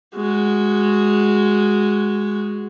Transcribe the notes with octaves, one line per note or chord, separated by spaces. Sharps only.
G#3 F#4